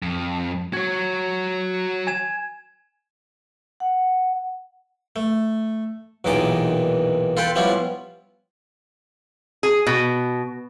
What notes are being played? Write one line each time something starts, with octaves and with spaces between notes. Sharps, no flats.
F2
F#4 C#5 G#6
G#5 G#6 E7
F#5
A3
B1 E2 A#2 D#3 D#5 D6
F4 A4 B4 G5 A5
F3 G3 B3 C#4 E4 F4
G#4
B2